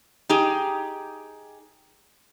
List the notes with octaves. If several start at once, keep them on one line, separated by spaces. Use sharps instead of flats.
D#4 G4 G#4